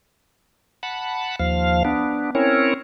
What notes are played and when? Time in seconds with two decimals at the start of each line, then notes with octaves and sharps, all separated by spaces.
0.83 F#5 A5 B5
1.40 D#2 F3 F5
1.85 B3 D4
2.35 C4 C#4 E4 A#4 C#5